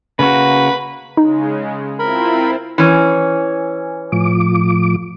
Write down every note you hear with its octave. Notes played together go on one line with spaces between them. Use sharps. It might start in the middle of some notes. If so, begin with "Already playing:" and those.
C#3 A#3 F#4 B4
C#3 G#3 D#4
C4 E4 F4 A#4 B5
E3 C#4
A2 F3 D6